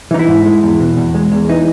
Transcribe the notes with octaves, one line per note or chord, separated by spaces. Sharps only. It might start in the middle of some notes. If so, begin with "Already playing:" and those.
E3 D#4
E4
G#2
G#3
E2
B2
E2
G#3
E2
E3 D#4